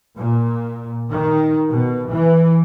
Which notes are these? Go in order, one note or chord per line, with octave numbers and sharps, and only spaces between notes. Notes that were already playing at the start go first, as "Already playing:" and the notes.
A#2
D#3
B2
E3